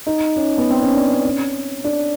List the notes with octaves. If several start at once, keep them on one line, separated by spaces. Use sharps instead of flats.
D#4
C#4
B3
C4
C#4
D4
C#4
D4